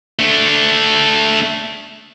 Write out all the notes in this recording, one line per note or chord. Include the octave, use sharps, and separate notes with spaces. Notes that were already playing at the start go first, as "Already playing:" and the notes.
A3 D4